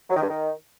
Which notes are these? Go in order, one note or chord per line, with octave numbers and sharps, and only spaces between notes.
F#3
D#3
G2
D#3